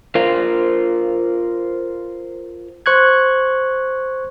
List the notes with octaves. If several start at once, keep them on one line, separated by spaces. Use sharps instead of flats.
F4 A#4 C5 F5
C5 C#6 F#6 G#6